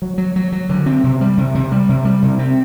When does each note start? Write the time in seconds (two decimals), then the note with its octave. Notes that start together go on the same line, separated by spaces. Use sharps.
0.02 F#3
0.18 F#3
0.36 F#3
0.52 F#3
0.69 D3
0.86 C4
1.04 C3
1.21 G3
1.38 C3
1.55 C3
1.71 G3
1.89 C3
2.05 G3
2.22 C3
2.39 C4